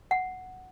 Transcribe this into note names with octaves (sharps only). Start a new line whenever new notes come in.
F#5